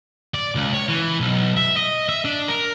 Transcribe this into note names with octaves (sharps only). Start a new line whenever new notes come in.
D5
C#2
C#5
E3
B1
E5
D#5
E5
D4
A#4